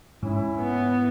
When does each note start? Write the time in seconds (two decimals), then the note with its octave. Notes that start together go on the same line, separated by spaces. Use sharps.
0.23 G#2 C#4 E4
0.60 B3